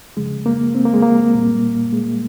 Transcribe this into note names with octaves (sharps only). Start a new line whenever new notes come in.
C#3 F3 G#3
A#3
C4
A#3
G#3
A#3
A#2 G3
G#3